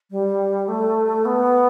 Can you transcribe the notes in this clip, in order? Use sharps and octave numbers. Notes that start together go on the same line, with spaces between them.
G3
A3
B3